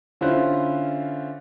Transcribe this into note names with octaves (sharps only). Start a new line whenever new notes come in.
D3 C#4 E4 F4 C5 F#6